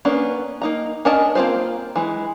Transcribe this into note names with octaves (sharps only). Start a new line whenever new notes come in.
A#3 B3 C#4 D4
A#3 D#4 A#5
C#4 D4 A#4 D#5 A5
A#3 C4 D#4 F4 C5
E3 G#3